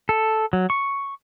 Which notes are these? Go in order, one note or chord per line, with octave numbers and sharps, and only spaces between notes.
A4
F#3
C#6